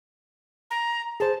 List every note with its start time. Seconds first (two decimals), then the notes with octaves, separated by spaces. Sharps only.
0.71 A#5
1.20 G#4 C5 A5